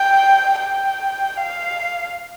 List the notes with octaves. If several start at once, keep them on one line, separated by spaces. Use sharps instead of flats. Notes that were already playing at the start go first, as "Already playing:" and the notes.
Already playing: G5
G5
F5